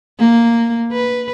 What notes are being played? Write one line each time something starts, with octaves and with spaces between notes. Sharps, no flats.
A#3
B4